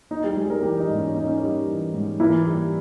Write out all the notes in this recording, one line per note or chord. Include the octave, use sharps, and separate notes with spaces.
A#3 D#4
G3 G4
G3 G#3 G#4
A#3 A#4
E3 G3 G4
D#4
G#2
C#4
A#3 D#4
C#4
G3 D#4
E3
G#2
E3 A#3 E4
G3